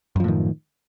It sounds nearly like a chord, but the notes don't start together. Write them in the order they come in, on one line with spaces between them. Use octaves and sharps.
F#2 F3 A2 D#3